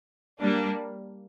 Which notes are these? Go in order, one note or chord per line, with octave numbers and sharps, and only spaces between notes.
G3 A#3 D4